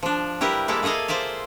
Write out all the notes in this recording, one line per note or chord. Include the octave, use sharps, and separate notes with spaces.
F3 D4
G3 E4 G4 A#4 B4
G3 G#3 A#3 E4 G4 A4
A#3 G#4 A4 D#5 F5
F4 C5 D5 E5 F5